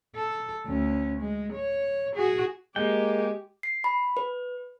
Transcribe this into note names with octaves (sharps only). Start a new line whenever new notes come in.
A4
D2 C#4
G#3
C#5
F#4 G#4
G#3 A#3 G4 G5
C7
B5
B4